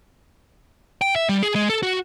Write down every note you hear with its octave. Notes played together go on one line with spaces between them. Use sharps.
G5
E5
G3
G#4
G#3
A4
F#4